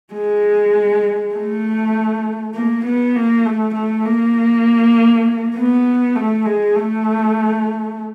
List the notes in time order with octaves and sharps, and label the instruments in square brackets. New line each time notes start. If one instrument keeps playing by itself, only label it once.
[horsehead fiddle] G#3
A3
A#3
B3
A#3
A3
A3
A#3
B3
A3
G#3
A3